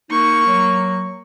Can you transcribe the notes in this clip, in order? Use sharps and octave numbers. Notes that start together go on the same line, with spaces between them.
A#3 D#4 C#6
F#3